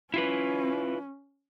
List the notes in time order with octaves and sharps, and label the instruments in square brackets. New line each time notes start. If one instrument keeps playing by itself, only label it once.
[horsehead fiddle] C#4 [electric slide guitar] E4 F4 B4